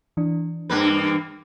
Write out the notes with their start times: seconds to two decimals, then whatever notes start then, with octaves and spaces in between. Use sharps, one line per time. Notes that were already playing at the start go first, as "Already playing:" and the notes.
0.17 E3 D4
0.70 G2 A#3 B4